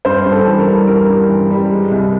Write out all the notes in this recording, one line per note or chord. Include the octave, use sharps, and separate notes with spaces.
G2 C5
G2
A4
E3
A#4
G3
G2 A#4
G2
E3
G3
G#3
C2